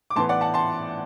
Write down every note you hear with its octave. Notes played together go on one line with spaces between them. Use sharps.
D6
A2 E3 B3 A5 C6
D5 F#5
F#5 A5
A5 C6